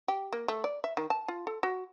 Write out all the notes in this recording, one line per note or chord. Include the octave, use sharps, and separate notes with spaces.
G4
A#3
A3
D5
E5
D#3
A5
F4
A4
F#4